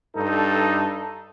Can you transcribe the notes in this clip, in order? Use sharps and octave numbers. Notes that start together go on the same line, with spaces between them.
G2 D#4 A4